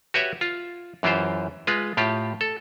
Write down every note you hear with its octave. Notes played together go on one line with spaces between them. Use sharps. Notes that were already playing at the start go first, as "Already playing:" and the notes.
F#4 G4 B4 C#5 E5
F4
F#2 E3 F4 G4 C5
G#3 F4 B4
A2 F4 G4
A4